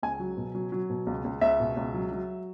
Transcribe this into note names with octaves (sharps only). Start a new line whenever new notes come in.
C#2 G#5
F#3
B2
F#3
F#3
B2
C#2
C#2
C#2 E5
B2
C#2
F#3
F#3